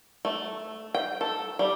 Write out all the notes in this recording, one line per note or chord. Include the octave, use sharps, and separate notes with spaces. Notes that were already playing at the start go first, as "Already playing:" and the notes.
A3
G5
A4
G3